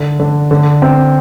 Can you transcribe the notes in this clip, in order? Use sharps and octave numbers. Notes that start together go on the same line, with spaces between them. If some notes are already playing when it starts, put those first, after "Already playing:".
Already playing: D3
D3
D3
C4